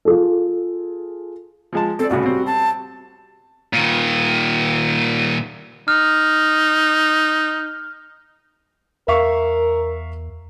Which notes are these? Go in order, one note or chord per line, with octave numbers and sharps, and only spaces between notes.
F4 G#4 A4
F3 G#3 A5
C4 A4 D5
C2 A2 C#3 F#4
G3 C4
A5
A#2 D#3
D#4 F6
E2 A#4 E5 F5 C#6